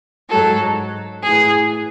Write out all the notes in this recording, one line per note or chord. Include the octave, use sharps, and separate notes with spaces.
G#2 F#3 A4
A2 E3 G#4